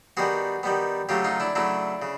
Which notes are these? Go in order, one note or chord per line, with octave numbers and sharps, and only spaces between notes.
D#3 G3 B3 F#4 G#4
D#3 G3 B3
C#3 F#3 A3 F4 G4
D#4 F4
D4 E4
C#3 F#3 A3 D4 E4
C#3